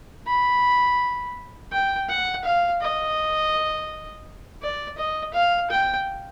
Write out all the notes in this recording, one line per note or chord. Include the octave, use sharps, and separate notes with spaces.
B5
G5
F#5
F5
D#5
D5
D#5
F5
G5